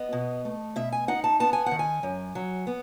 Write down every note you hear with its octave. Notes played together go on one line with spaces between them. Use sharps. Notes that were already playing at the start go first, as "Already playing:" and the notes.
Already playing: B3 D#5
B2
A3
B2 E5
G#5
D#4 F#5
A5
B3 A5
G#5
D#3 F#5
G#5
F#2
F#3
B3